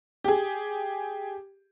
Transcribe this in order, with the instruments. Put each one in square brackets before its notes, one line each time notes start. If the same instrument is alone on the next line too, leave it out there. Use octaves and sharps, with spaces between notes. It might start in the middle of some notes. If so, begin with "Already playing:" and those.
[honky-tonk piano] G4 G#4